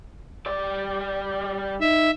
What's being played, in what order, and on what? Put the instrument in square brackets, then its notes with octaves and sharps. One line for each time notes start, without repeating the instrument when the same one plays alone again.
[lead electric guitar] G3 D5
[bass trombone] D#4 [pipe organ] E5